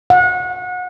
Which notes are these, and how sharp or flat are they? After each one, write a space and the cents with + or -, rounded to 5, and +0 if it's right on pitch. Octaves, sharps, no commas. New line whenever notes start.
F#5 -30